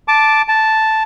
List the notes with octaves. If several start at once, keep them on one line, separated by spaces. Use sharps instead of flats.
A5 D6
A5